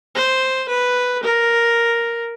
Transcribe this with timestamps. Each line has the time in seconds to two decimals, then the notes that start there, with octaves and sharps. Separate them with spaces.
0.15 C5
0.68 B4
1.23 A#4